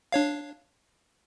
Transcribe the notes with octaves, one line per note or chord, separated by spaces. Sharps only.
D4 C#5 F5